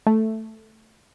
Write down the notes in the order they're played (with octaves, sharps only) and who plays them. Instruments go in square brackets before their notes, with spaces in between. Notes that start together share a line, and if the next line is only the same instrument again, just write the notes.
[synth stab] A3